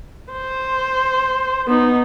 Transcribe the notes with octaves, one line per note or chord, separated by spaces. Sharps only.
C5
B3 D#4